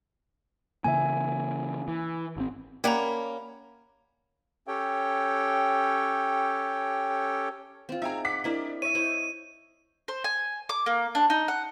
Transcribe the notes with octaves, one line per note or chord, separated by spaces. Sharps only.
C#3 E3 A#3 E5 G#5
E3
G#1 C4
A#3 C#4 G4 D5 F#5 A#5 B5 G#6
C#4 G4 A4 C#5 G5
C4 F4
D#4 G#4 E5 G5 A#5
F#5 D6 B6
C4 D4 E4 A#4 D5 D#5
C#5 E5 D#7
E4 C5 D#5
C5
G#5
D6
A#3
D4
D#4
F#5